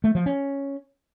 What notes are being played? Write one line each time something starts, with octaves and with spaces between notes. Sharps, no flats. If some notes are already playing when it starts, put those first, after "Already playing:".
A3
F3
C#4